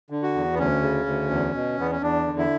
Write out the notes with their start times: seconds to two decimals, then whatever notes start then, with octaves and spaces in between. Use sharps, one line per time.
0.10 D3
0.22 F#4
0.35 E2
0.54 B3
0.59 D2 C#4
0.82 C#3
1.06 D2
1.30 E2
1.54 B2
1.78 E2 B3
1.91 C#4
2.02 E2 D4
2.26 D3
2.38 E4